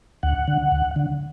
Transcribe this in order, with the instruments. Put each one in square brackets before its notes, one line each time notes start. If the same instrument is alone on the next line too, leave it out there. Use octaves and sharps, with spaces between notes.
[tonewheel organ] D2 F#5
D3
D2
D3